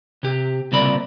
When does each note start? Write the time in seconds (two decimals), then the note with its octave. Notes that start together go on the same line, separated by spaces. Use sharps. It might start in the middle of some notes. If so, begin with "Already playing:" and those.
0.23 C3 G4
0.72 C2 A#2 C#3 C4 D5 B5